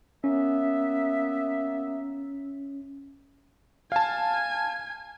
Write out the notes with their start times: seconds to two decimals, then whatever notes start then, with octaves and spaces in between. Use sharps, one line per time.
0.24 A#3 B3 C#4 E5
3.92 F5 G#5 A5